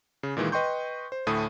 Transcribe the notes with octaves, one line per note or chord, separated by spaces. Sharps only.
C#3
A#2 D#3 E3 G#3
B4 D#5 G5 C6 C#6 G6
C5
D2 A2 A3 D#6 D#7